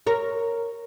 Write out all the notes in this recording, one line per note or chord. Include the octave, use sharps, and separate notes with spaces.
A#4 C#5